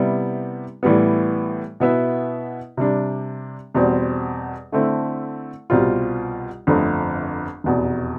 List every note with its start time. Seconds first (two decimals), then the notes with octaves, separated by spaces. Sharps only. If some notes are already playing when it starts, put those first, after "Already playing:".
Already playing: C3 G3 B3 E4
0.83 A2 E3 G3 B3
1.80 B2 B3 E4 B4 E5
2.77 C3 G3 D4
3.74 E2 B2 G3 C4
4.72 D3 A3 C4 E4
5.70 C2 B2 G3 C4 F4
6.67 G1 F2 D3 A3 C4
7.64 F1 E2 B2